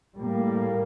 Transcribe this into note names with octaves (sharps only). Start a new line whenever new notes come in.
A2 G3 A#3